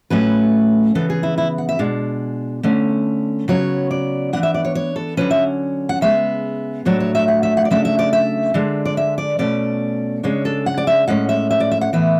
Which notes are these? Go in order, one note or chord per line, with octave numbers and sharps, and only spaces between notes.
A2 F#3 A3 C#4 B4
C#3 E3 B3 A4
G#4
E4
E4
F#5
E5
B2 G#3 D4
D3 A3 C#4
C#3 F#3 B3 C#5
D5
E3 B3 D4 F#5
E5
D5
C#5
C#5
A4
D3 F#3 C#4 B4
E5
F#5
C#3 G#3 B3 E5
A2 F#3 A3 D4 C#5
C#5
E5
F#5
E5
F#5
D5
C#3 F#3 A3 D4 E5
E5
D5
E5
D3 G#3 D4
D5
E5
D5
B2 A3 C#4 D5
C#3 G#3 D4 C#5
A4
F#5
D5
E5
A2 G#3 C#4 F#5
E5
E5
D5
E5
F#5
A2 E3 B3 E5